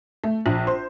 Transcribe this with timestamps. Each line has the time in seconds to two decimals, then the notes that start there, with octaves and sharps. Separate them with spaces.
0.24 A3
0.46 A#1
0.67 C5